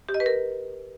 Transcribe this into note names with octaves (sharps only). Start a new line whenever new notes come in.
G4
D#5
B4
A#4